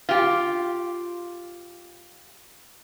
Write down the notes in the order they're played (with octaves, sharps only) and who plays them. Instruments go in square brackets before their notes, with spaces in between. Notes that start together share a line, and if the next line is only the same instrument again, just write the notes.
[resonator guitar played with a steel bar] F4 G4